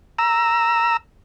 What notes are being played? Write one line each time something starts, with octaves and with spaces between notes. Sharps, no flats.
A#5 E6